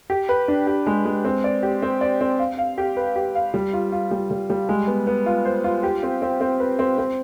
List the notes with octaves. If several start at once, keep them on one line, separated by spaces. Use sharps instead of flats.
G4
B4
D4
G4
G#3
G#3
C4
D5
G4
C4
D5
C4
F5
F5
G4
B4
G4
F5
G3
F4
F4
G3
G3
G3
G#3
B3
B3
F4
C5
F4
G4
C4
C4
C4
B4
C4
C4